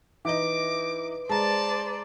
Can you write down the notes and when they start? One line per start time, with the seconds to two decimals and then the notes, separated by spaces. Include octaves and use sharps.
0.25 E3 D#4 B4 D#5 D6
1.29 G#3 C5 D5 A5 A#5